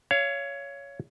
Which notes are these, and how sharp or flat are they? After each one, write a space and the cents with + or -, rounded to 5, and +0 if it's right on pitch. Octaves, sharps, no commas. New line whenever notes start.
C#5 +15 F5 -30